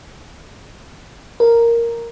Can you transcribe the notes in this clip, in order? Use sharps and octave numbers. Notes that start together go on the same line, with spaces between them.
A#4